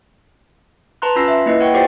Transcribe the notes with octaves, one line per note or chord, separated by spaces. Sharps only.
B4 A5 A#5 C6 F#6
C#4 F4 B5 E6 A#6 C7
E5
A#3 E4 B4 D#5 C7
B4 C#5 F#5 G5 C#6
F4 G4 C5 D5 F#5 G5